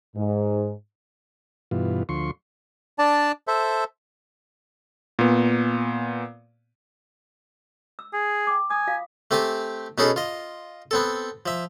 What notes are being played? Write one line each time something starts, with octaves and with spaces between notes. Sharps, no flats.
G#2
G2 B2 E3 F4
D2 F3 C6 C#6
D4 D5 A5
A4 C5 E5
A#2 B3
E6
G#4
G5 D6
G#5 D#6
F4 F5
A3 C4 G4 G#5 A5
B2 B3 C#4 D#4 G#4 A4
F4 D#5
B3 C4 A4
F3 E5